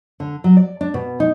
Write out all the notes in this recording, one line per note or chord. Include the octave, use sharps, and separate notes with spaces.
D3
F#3
D5
D4
B2
D#4